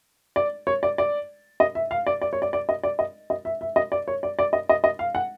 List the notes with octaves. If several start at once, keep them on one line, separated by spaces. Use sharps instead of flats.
D5
C#5
D5
D5
D#5
E5
F5
D5
D5
C#5
D5
D5
D#5
D5
D#5
D#5
E5
E5
D#5
D5
C#5
D5
D5
D#5
D#5
D#5
F5
F#5